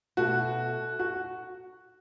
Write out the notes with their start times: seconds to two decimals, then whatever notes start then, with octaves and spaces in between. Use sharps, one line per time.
0.17 B2 A3 E4 F#4 A4
0.99 F#4